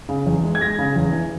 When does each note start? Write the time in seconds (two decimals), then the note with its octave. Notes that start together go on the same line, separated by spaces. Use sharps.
0.09 C#3
0.27 E2
0.43 G#3
0.55 G#6
0.61 G#3 A#6
0.79 C#3
0.96 E2
1.13 E3